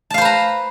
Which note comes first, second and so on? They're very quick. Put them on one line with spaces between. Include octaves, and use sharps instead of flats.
A5 F5 C5 B4 A#5